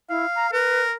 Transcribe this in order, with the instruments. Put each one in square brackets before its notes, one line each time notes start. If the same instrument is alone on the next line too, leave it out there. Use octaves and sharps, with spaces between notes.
[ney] E4 [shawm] F5
[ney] A#5
[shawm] A#4 [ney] B4